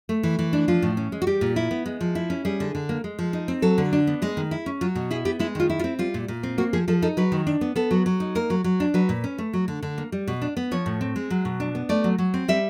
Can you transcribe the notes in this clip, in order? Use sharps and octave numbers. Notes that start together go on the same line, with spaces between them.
A3
E3
E3
D4
F3 F4
A2
C#4
G#3
F#4
G3 G4
A#2
E4
B3
G#3
F3
E4
C#4
G3 G#4
D3
D3
A#3
G#3
F3
D#4
C4
F#3 A4
D3
D4
B3
G#3 G#4
D#3
E4
C#4
F#3 F4
B2
E4 G#4
B3 G4
G#3 E4
D#3 F4
E4
F4
C4
G3 F4
A#2
A#2
C4
A#3 F#4
F3 G#4
F3 A4
D#4 A4
F#3 B4
D#3
D4
B3
B3 A4
F#3
F#3
D#4
A#3 A#4
F#3
F#3
D4
F#3 B4
A#2
C#4
A3
F#3
D3
D3
A#3
G3
B2
D4
B3
F3 C#5
A2
C4
G#3
F#3
B2
D4
B3
A3 D5
F#3
F#3
C4
G3 E5